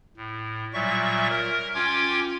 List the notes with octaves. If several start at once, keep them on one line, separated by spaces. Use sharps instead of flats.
A2
A#2 F#3 G3 E5 C#6
A#4
C#4 F4 G5 D6 G#6